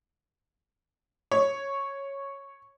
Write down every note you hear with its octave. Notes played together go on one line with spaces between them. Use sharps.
C#5